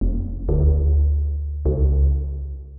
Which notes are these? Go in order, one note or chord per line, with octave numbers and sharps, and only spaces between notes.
F1
D2
C#2